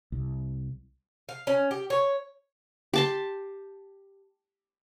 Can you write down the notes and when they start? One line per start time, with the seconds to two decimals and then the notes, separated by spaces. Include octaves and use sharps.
0.12 C2
1.29 F5
1.47 C#4
1.71 G4
1.90 C#5
2.93 G4 A5 C6